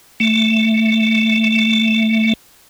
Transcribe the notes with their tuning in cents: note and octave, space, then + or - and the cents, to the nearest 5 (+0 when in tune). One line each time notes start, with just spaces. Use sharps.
A3 +10